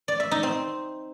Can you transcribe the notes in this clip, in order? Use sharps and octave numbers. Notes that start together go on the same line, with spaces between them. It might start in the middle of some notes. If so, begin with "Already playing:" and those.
D5
E5
D#4
C4